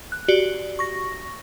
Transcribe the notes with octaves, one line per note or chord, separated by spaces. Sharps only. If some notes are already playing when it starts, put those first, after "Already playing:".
F#6
F#4 G4 D5
C#6 A#6